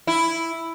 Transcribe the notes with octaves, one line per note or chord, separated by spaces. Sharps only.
E4